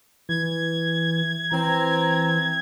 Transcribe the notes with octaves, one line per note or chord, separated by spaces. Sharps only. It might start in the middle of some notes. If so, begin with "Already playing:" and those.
E3 G#6
E3 C4 A#5